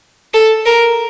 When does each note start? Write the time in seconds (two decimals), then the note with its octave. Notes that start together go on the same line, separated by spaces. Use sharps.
0.34 A4
0.65 A#4